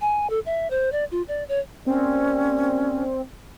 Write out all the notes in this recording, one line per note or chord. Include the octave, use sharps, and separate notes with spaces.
G#5
A4
E5
C5
D5
F4
D5
C#5
A#3 C4 C#4 G4 D5